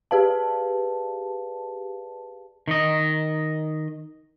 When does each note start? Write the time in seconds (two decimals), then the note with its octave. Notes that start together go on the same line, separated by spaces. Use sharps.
0.11 G4 G#4 B4 D5 F5 A5
2.68 D#3 D#5